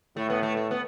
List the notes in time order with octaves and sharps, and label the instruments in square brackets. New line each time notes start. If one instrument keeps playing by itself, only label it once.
[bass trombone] A2 [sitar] A3
[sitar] B3
A3
A3
B3